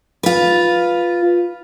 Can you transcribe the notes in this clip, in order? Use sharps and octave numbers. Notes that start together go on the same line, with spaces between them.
F4 B4